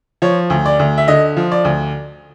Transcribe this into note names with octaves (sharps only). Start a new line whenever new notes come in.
F3 C#5
D2
D5
D2
E5
D3 D#5
F3
D5
D2